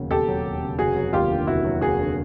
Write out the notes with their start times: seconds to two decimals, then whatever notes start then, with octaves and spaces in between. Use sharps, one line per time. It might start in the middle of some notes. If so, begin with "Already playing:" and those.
Already playing: E1 D#2 C#3 F#3
0.11 E1 G4 A4
0.28 F#3
0.45 D#2
0.62 C#3
0.78 F1 F#4 G#4
0.96 F#3
1.13 D#2 F4 G4
1.31 D3
1.47 F1 E4 F#4
1.64 F#3
1.81 D#2 F#4 G#4
1.99 D3